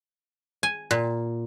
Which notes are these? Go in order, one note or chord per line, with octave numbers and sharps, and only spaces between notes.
G#5
A#2